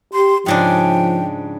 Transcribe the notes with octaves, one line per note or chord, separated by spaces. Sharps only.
G4 C6
G#2 C#3 F3 D4 G5